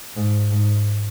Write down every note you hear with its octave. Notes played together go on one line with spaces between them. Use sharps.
G#2
G#2